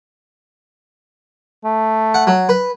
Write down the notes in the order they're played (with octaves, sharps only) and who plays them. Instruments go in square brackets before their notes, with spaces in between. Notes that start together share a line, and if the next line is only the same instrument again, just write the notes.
[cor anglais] A3
[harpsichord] F#5
F#3
B4